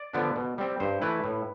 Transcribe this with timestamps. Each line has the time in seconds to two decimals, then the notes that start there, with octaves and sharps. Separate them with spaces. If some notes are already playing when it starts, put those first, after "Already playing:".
Already playing: D5
0.13 D3 F3 B3 D4
0.36 B2
0.58 G3 C4
0.80 G2 C5
1.01 E3 A3 E4 B4
1.24 A2